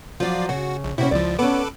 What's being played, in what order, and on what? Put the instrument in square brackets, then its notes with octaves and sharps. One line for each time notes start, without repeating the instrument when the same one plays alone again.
[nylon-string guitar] F3 F#3 [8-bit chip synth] F4 D5
[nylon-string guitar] C#3 [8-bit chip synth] F#4
[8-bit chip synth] A#1
[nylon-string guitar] C3 C#4 [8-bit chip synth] E4 F#4
[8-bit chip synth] C#2 F3 [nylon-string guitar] E4 D5
[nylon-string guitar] B3 C#4 [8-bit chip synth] A4 B4 D6